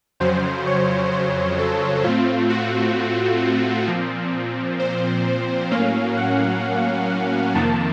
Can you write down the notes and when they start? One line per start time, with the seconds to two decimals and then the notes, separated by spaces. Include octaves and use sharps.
0.20 F2 C#3 F#3 C5
0.67 C#5
1.12 C5
1.59 A4
2.04 A2 A3 C4 F4
2.50 F#4
3.88 A#2 F3 C4
4.79 C5
5.71 A2 F#3 A#3 C#4 F5
6.17 F#5
7.55 F2 C3 D#3 A#3 A5